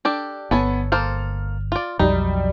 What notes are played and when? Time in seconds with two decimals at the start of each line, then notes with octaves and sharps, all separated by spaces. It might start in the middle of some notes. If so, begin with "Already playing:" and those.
0.05 D4 G4 A4
0.51 G1 B3 A4 C#5 G#5
0.92 A#3 A4 C5 F6
1.72 F4 D5
1.99 B1 F2 F#3 G3 D#4